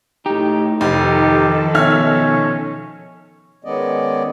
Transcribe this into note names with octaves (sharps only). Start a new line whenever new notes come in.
A2 D#4 G4
F1 D#3 F3 D#4 G4 A4
B2 C#4 D#4 E5 F6
D#3 G#3 B3 C#4 D5 D#5